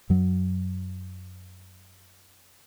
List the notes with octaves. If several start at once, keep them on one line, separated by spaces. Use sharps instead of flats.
F#2 F#3